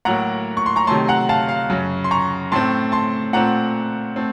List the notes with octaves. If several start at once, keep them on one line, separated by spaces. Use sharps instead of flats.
A2 F#3 A#3 F#5 A#5
C#6
C6
A#5 C#6
C3 D#3 F#3 A3 A5 C6
F#5 A#5
F5 A5
F5
F#2 C#3 F#3
C6
A#5 C#6
A2 A3 C4 A5 C6
A5 C6
A#2 A3 C4 F#5 A#5
A3 C4